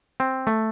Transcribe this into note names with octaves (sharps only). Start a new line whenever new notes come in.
C4
A3